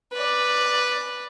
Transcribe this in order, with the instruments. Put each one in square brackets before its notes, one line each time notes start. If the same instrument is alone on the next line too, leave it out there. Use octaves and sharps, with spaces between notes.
[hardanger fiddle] B4 D5